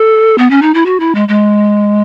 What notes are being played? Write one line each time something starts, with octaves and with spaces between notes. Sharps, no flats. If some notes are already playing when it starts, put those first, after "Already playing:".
Already playing: A4
B3
C#4
D#4
E4
F#4
E4
G#3
G#3